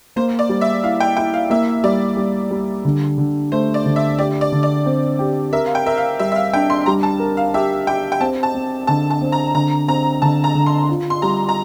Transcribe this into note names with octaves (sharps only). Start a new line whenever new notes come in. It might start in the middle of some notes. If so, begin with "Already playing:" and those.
A#3 C5
D5
G3
E5
E4 F5
G5
E4 G5
F5
A#3 E5
G3 D5
G3
G3
D3
D3
A3 C5
D5
D3
E5
G4 D5
D5
D3
D5
C4
G4
A#4 E5
F5
G5
A#4 E5
F5
G3 E5
E5
F5
D4 G5
C6
G3 A#5
A5
A#4
F5
G4 E5
G4 G5
G5
C4 A5
A5
C4
D3 A5
A5
C4
A#5
D3 A#5
C4 A#5
D3 A5
A#5
D3
C6
F4
C6
G3 A#5
A#5